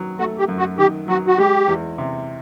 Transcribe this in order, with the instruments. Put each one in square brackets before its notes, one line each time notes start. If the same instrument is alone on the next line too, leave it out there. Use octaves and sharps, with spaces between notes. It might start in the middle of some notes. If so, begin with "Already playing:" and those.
Already playing: [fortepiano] D#3 F#3
[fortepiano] A3 [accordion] F#4
[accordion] G4
[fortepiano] F#2
[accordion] F#4
[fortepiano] D#3 [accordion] G4
[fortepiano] F#3 [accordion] F#4
[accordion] F#4
[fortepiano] G#3 [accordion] G4
[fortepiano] E2
C3